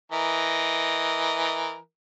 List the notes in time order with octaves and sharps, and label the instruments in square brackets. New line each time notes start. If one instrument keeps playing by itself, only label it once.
[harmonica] E3 A#4 D#5